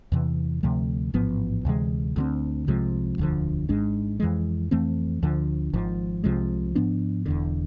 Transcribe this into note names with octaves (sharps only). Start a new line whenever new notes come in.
E2 C3 E3
D2 C3 F3 A3
A1 G#2 F3 B3
D2 C3 E3 G#3
D2 D3 G#3 C4
C2 C3 F3 G#3
E1 D2 D3 F3
G#1 G#2 G#3 D4
F2 E3 G#3
F2 E3 A3 C4
D2 D3 F3
G#1 G#2 F3
C2 C3 F3 G#3
G#2 F3 B3 D4
E1 E2 D3